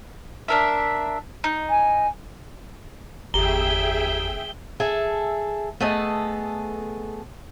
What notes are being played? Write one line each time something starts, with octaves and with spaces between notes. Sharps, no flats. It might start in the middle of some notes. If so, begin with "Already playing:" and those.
D4 A#4 E5
D#4
G#5
G1 E2 G4 G#4 E5 G5 A#5 G7
G#4 A4 E5
A3 B3 G#4 A4 D#5